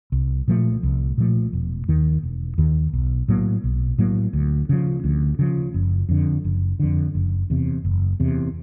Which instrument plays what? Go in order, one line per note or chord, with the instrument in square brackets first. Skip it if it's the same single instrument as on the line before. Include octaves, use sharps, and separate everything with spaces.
[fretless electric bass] C2
A#2 F3 A3
C2
A#2 F3 A3
E1
D#2 D#3
E1
D#2 D#3
B1
A2 F#3 A#3
B1
A2 F#3 A#3
D2
C#3 F3
D2
C#3 F3
F#1
F2 D3
F#1
F2 D3
F#1
E2 C3
F#1
E2 C3